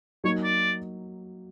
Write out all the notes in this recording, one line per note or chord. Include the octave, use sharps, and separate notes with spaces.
F#3 A#3 D#4 C#5
D5